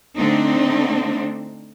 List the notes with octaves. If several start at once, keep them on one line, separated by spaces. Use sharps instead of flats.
D3 A3 C4 D4 D#4